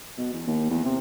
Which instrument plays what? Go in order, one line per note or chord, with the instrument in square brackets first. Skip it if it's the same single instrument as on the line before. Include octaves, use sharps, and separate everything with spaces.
[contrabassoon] B2
E2
D#2
E2
C3